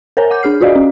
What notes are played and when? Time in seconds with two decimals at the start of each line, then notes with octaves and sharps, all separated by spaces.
0.17 A#4 C5 C#5 G#5 A#5
0.30 F#5 D6 G6
0.43 D4 G#4 F6 C7
0.61 F4 F#4 D5 D#5 F5
0.75 C#4